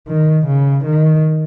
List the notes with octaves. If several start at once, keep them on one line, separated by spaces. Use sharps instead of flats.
D#3
C#3
D#3